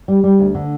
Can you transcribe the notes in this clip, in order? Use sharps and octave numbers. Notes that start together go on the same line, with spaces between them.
G3
G3
D2
D3